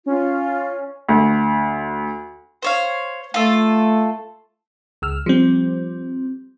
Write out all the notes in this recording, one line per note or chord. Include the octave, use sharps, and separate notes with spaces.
C#4 F4
D2
C5 C#5 F5
A3 F4 A4
C#2 E6 F6
F3 G3 C4